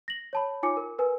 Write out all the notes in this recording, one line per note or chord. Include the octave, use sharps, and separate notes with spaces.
A#6 F#7
C#5 A5 B5
D#4 F4 C#5 G#5 D6 C#7
A#4
A#4 B4 G#5